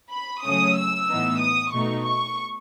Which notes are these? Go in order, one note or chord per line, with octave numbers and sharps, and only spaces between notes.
B5
C#3 F#3 A3 C#4 D#6
E6
A2 E3 B3 D#4
D#6
B2 A3 D#4 C#6
C#6